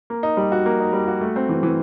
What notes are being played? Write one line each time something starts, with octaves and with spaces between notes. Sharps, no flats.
A#3
D#4
G3
F#4
A#3
D#4
G3
F#4
A3
C4
E3
E3